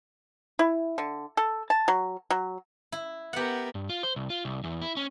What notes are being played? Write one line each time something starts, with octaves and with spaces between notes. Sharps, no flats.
E4
D3
A4
A5
F#3
F#3
E4
B3 G4 A#4 F#5
G2
F4
C5
C2
F4
C2
E2
E4
C#4